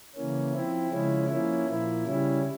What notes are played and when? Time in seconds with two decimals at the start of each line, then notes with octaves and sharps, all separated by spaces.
0.16 C#3 E3 A#3 C#4
0.53 F3 C4 E4
0.91 C#3 F3 G#3 C#4 E4
1.29 F3 A#3 C#4 E4
1.67 A#2 F3 A#3 E4
2.04 C#3 G3 C#4 E4